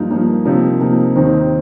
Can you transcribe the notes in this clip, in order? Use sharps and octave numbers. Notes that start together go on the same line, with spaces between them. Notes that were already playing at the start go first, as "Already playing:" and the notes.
Already playing: G2 F3 A#3 D#4
G2 F3 A#3 D#4
C3 F3 A#3 D#4
C3 F3 A#3 D#4
D#2 D#3 C4 D#4